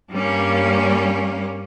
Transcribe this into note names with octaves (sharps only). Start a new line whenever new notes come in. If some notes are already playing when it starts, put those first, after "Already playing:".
G2 G3 A#3 C#4